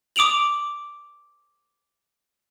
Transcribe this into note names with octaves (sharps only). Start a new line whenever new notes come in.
D6 D#6 D7 F7 F#7